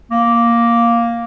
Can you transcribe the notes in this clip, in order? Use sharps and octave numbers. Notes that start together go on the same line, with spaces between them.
A#3